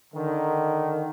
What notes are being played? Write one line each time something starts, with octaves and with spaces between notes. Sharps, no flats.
D3 D#3